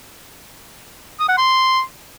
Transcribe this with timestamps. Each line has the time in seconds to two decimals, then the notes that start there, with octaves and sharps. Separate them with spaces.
1.20 D#6
1.29 F#5
1.38 C6